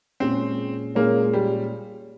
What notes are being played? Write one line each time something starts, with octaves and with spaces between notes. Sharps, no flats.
A#2 G#3 C4 C#4 G#4 C#5
A#2 G#3 A#3 C#4 G#4 C#5
G3